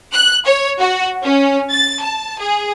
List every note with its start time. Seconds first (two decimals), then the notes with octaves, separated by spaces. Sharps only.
0.13 F#6
0.45 C#5
0.79 F#4
1.22 C#4
1.71 A6
2.02 A5
2.39 G#4